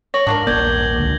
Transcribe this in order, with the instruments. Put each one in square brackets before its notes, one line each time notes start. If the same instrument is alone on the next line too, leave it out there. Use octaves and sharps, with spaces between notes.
[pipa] C#5 [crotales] A#6 F#7
[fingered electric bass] G#2 [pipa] D4 F4 A#4
[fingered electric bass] D#1 A#1 A#3 [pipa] D5 [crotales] G6 G#6 G7
[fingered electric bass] C#2 D3